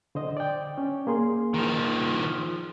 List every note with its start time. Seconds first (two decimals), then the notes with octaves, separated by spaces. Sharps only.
0.15 D3 C5 D#5
0.37 D5 G5
0.78 C#4
1.07 A#3 G#4 C6
1.54 D#3 F3